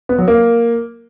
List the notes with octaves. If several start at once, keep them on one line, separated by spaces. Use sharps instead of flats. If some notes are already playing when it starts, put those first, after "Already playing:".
B3
F#3
A#3